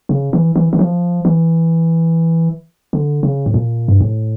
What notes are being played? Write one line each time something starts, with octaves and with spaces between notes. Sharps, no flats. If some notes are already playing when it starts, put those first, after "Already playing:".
C#3
E3
E3
E3
F3
E3
D3
C#3
A2
A#2
G2
A2